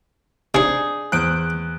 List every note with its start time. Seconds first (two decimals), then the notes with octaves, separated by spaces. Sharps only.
0.54 C3 D4 D#4 G#4 C#6
1.12 E2 C5 D#6 F#6 D7